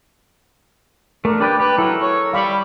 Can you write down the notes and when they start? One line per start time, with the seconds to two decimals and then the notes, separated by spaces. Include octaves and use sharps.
1.25 A3 D4 A#4
1.40 D4 G4 B4 D5
1.60 G4 B4
1.78 F#3 E4 A4 A#4
2.01 C#5
2.33 G3 F5 B5 C#6